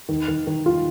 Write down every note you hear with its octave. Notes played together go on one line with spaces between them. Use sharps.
D#3
D#3
D#3
F4